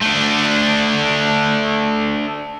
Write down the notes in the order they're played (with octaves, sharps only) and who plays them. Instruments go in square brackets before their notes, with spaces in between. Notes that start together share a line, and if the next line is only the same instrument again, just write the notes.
[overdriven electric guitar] A3 D4